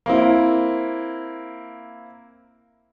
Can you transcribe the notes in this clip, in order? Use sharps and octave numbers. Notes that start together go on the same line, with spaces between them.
A#3 C4 E4